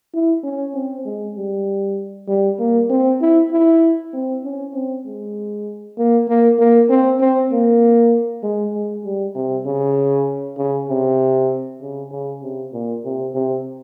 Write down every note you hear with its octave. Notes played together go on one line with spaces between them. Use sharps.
E4
C#4
C4
G#3
G3
G3
A#3
C4
E4
E4
C4
C#4
C4
G#3
A#3
A#3
A#3
C4
C4
A#3
G#3
G#3
G3
C3
C#3
C#3
C3
C#3
C#3
C3
A#2
C3
C3